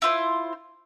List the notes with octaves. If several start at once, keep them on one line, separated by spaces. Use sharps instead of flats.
E4 F4 C5